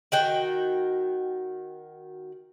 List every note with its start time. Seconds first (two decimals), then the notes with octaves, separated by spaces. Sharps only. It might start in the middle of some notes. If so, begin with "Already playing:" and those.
0.12 D#3 F#4 G5